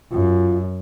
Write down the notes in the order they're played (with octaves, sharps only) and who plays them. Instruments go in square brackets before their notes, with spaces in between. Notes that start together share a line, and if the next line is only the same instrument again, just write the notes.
[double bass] F#2 [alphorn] F4